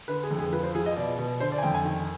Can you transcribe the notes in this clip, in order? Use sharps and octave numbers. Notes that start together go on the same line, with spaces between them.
D3 B4
G#4
F2
G#4
F3 B4
C5
F3 G#4
D#5
B2 D5
B2
D3 C5
D5
G#5
F2 G5
G#5
D#3